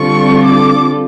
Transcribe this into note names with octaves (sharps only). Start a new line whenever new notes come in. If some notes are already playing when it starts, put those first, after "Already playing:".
Already playing: D3 G3 C4 F4 A4 C#6
D6